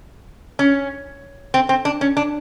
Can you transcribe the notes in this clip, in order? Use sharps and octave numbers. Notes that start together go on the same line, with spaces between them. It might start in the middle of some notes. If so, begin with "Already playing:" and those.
C#4
C4
C4
D4
C#4
D4